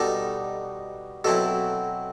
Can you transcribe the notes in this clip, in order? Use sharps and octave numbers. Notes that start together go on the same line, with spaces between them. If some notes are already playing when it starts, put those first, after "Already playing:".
Already playing: B2 G3 D#4 A4
B2 F#3 C4 E4 A4